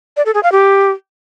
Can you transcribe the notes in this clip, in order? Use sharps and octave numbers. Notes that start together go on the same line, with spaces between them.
D5
A4
G#4
F5
G4